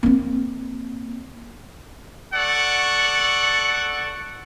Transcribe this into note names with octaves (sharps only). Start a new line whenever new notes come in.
A#3 C4
A4 D5 F#5 C#6